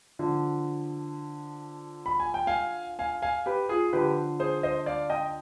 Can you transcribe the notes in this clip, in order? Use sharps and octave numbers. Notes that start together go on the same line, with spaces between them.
D3 F3
B5
G#5
G5
F5 G#5
F5 G#5
F5 G#5
G4 B4
F4 G#4
D3 F3 G4 B4
G#4 C5
C5 D#5
D5 F5
D#5 G5